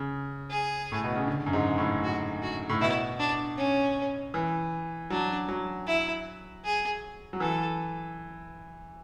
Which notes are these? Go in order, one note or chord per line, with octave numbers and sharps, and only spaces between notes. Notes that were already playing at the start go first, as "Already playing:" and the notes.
Already playing: C#3
G#4
A2
B2
C#3
D3
F#2
G#2
A2
F#4
F#4
A2
B2 E4
D4
C#4
E3
F#3 D4
F#3
E4
G#4
F#3
E3 A4